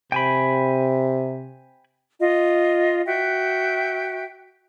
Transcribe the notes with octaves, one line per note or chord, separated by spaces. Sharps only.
C3 G5 G#5 B5
F4 D#5
F#4 E5 G5